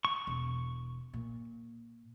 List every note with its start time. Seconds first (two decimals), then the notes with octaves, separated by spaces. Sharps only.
0.05 C#6
0.27 E1
1.13 A#2